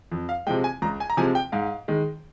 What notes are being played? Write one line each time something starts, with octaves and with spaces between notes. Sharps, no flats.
F2
F5
C3 F3 G#3 G5
G#5
C#2 A#5
G#5
A#5
C3 F3 G#3 G#5
G5
G#2 F5
D#3 G#3